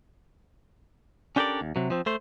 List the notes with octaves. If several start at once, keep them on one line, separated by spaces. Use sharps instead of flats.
C#4 D4 G4 A4 A#4 D5
D#2
C3 F#3
F3 C4
A3 C5